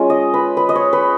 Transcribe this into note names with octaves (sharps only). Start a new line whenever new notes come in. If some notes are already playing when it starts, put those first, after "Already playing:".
Already playing: G#3 C#4 F4
D#5
B4
B4
D#5
C#5
B4